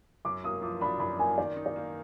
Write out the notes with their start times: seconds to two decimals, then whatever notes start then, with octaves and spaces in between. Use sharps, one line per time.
0.25 F#2 D6
0.44 A#3 D#6
0.62 F3 D6
0.81 D4 B5
1.00 F#2 B5
1.19 A#3 G#5
1.38 D#3 D5
1.56 D#4
1.66 D5
1.76 A#3